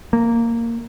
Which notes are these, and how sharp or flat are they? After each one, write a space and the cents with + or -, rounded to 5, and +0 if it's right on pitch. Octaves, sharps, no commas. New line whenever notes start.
A#3 -10